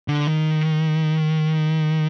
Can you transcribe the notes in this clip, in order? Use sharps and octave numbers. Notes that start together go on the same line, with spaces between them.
D3
D#3